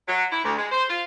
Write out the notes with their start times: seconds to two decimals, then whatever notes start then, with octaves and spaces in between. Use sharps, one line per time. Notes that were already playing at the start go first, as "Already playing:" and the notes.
0.08 F#3
0.31 E4
0.44 D2
0.57 G#3
0.72 C5
0.89 F4